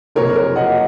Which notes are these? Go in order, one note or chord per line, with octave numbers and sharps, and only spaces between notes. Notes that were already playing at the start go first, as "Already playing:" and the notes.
F#1 F2 C3 A#4 C#5
A#4 C#5
D#5 F#5